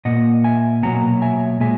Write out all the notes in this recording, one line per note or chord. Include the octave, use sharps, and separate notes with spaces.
A#2 A#3 D#5 F#5
E5 G#5
B2 F#3 A#3 F#5 A#5
E5 G#5
A#2 G#3 E5 G#5